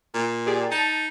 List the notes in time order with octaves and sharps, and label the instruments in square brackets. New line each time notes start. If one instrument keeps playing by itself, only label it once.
[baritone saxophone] A#2
[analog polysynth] G4 G#4 D5
[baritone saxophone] D#4 [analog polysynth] A5